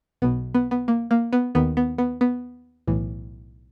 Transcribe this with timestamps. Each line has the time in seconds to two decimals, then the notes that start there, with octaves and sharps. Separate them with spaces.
0.22 B1 B2 B3
0.54 B3
0.71 B3
0.88 A#3
1.11 A#3
1.33 B3
1.55 D#2 D#3 B3
1.77 B3
1.98 B3
2.21 B3
2.87 B1 A2 E3